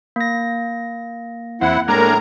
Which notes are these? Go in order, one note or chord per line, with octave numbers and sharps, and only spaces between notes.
A#3 A#6
E2 C4 E4 F#5
A2 G#3 A#3 D4 A#4 A#5